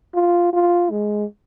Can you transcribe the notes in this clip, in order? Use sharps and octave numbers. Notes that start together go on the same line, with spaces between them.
F4
F4
G#3